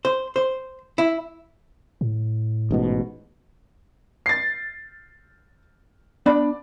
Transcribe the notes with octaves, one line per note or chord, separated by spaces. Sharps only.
C5
C5
E4
A2
A1 G#2 B2
A6 C7
B3 D4 D5 B5